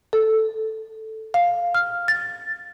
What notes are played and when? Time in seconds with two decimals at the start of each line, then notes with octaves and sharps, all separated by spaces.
0.13 A4
1.34 F5
1.75 F6
2.08 A6